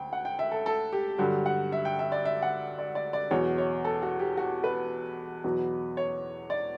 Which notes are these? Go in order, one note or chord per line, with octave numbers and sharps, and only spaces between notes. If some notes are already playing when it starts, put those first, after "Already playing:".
Already playing: D2 G5
F#5
G5
E5
A4
A4
G4
G2 D3 F#3 G4
F#5
E5
G5
E5
D5
E5
F#5
D5
D5
D5
E2 B2 F#3 C#5
C#5
A4
F#4
G4
F#4
B4
E2 B2 F#3
C#5
D5